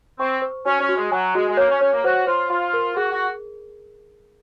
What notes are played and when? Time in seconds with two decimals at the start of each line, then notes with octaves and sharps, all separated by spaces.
0.19 C4 C#6
0.42 C5
0.66 C#4 F#4
0.81 C#4
0.89 F#4
0.96 G#3
1.11 F#3 G#5
1.35 G#3 F#4
1.49 G#3
1.57 A#3 C#5
1.69 C#4
1.81 C#4 C#5
1.93 A#3
2.04 F#4 C5
2.27 F4 C5
2.50 F4 C6
2.73 A#4
2.96 F#4 G#4
3.12 F#4